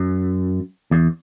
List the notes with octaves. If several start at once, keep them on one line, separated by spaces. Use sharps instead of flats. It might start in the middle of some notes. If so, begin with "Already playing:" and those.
Already playing: F#2
E2